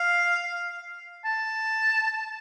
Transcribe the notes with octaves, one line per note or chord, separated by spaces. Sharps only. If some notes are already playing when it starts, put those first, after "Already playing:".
Already playing: F5
A5